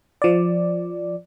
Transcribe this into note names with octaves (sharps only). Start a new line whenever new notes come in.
F3 D5